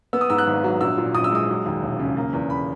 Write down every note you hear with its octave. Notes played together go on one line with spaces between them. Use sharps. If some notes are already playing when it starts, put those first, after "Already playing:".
B3 E6
D#6
G#2 E6
F#6
G#1
F#3
A#1 E6
A#2
A#1 D#6
E6
G#3 D#6
F#3
D#2
E1
C#3
A#3
E2
B5